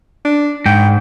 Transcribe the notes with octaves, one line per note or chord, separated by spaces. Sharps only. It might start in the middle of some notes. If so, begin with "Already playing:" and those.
D4
G#2 G5